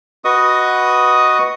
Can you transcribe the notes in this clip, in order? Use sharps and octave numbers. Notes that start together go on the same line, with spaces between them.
F#4 B4 D#5 C#6 D#6